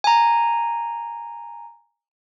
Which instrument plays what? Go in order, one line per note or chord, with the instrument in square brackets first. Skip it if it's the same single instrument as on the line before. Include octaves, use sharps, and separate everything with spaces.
[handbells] G#5 A#5